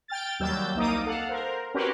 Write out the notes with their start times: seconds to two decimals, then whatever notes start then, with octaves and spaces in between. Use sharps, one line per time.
0.08 G5 F6 A6
0.39 D#2 F#3 G3 E6 G6 A6
0.75 C2 A#3 D#4 D6 D#6
1.05 A4 F5 F#5
1.29 A#4 C5
1.74 C4 C#4 F#4 G4 A#4 B4